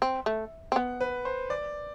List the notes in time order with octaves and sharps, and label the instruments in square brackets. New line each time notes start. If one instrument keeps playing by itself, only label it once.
[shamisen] C4
A3
C4
[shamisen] B3 [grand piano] F#5
[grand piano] B4
C5
D5